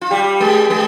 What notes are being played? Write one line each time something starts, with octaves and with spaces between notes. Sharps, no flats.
F4
G3 G4
G#3 G#4
G#3 G#4